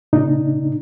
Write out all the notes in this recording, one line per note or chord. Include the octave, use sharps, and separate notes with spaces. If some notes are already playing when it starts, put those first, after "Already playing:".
A#2 C#3 D4 D#4